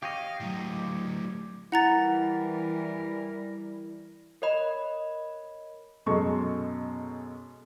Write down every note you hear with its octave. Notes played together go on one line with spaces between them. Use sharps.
G4 C#5 D#5 F5
A2 F#3
E3 G3 E4 A#4 F#5 A#5 A6
A#4 C#5 D#5 B5
F#2 B2 G#3 A4 C#6